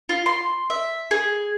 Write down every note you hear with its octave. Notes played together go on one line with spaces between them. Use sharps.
F4
C6
E5
G#4